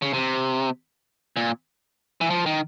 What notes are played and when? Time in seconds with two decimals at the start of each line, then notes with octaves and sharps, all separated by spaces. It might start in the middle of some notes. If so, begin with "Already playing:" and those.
0.02 C#3
0.13 C3
1.37 A#2
2.21 E3
2.30 F3
2.46 D#3